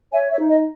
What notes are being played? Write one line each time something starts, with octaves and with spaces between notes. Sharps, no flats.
C#5 E5 G#5
C#5 E5
D#4
D#5